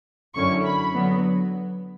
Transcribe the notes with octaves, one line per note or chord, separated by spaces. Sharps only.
F#2 D3 F#3 C#4 E4 C#6
B5
D3 F#3 B3